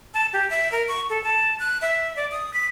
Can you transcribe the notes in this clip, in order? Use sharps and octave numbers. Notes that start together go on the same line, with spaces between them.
A5
G4
E5
A#4
C#6
A4
A5
F#6
E5
D5
D#6
B6